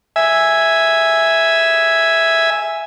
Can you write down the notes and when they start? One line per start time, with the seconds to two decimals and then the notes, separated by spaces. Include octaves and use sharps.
0.16 E5 G#5